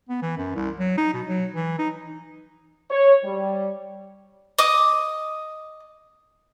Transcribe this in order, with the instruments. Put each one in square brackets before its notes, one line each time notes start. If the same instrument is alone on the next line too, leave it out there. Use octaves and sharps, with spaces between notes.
[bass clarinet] B3
E3
F#2
C2
F#3
D#4
B2
F#3
E3
D#4
[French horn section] C#5
G3
[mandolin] D#5 D6